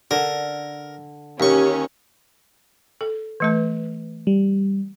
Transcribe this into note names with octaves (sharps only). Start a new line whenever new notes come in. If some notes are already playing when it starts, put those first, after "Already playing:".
D3 A#4
D#2 C#4 G4 C#6
A4
E3 A3 B4
G3